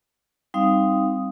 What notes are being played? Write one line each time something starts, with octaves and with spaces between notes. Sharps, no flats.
G3 C4 D#4 F5 D#6